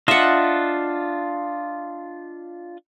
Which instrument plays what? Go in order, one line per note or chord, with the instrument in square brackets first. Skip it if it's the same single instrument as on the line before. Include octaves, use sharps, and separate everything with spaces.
[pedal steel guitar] D4 F4 D#5 [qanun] E5 F#5